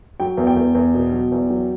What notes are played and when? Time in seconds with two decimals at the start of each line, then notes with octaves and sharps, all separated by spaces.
0.20 F#3 G5
0.38 E2
0.47 G5
0.57 E2
0.75 E2
0.94 B2
1.13 F#3
1.32 E2
1.50 F#3